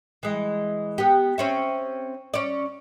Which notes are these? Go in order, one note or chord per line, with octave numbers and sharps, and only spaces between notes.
E3 G#3
B3 G4
C4 C#4 E5
C#4 D5